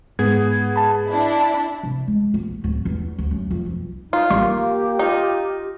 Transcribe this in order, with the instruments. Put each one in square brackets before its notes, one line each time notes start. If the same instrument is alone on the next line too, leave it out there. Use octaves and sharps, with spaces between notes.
[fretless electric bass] G#2 [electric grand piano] B3 G#4 [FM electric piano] G#6
[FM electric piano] A5 B5
[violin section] D4 E4
[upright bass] C3
G#3
A#1
D1
E2
D2
F#2
F2
B1
[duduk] D#4 [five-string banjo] F4
[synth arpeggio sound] A1 G3 C6 [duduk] A#3 [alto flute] G4
[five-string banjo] D#4 [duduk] F4